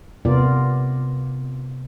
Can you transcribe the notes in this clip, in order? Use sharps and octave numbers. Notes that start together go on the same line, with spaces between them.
C3 B3 F4 A#4 D5